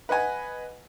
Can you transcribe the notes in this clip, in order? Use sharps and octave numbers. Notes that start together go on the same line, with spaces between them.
B4 D#5 F#5 G#5